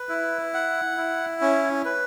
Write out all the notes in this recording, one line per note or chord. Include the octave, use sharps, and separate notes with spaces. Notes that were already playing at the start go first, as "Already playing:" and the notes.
Already playing: B4
E4
F#5
E4
C#4
B4